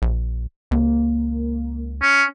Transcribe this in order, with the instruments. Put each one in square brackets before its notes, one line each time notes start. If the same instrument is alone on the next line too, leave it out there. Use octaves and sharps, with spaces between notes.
[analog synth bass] A#1
[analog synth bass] C#2 [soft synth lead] A#3
[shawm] C#4